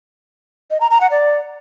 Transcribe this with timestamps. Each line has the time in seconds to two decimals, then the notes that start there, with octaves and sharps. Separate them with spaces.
0.70 D#5
0.80 A#5
0.91 A#5
1.01 F#5
1.11 D5